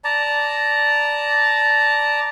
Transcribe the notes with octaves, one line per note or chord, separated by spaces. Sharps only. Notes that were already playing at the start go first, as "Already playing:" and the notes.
D5 A5 A#5